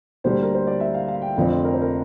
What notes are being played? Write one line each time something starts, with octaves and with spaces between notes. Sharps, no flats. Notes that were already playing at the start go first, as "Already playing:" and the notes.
D2 D3 G3 A#3 C5
A#4
C5
D5
E5
F5
F5
G5
F1 F2 D3 F3 C4 F5
A#4
C5
A#4